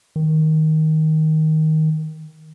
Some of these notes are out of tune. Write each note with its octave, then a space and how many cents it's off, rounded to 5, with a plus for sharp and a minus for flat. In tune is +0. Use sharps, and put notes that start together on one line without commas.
D#3 +10